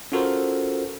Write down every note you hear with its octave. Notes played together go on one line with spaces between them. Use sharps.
C#4 F4 F#4 A4 A#4 C5